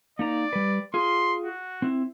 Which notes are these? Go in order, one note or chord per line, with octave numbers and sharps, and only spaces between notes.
A#3 D#4 D5 A#5
G3 B4
F4 G#4 C6
F#4
C4 E4